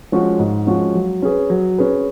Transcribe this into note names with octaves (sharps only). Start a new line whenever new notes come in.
F3 G#3 C#4 F#4
G#2
F3 G#3 C#4 F#4
F#3
C#4 G#4 B4
F#3
C#4 G#4 B4